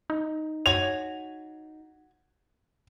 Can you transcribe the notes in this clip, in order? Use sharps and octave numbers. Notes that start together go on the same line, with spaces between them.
D#4
F#4 C#5 G#5 F7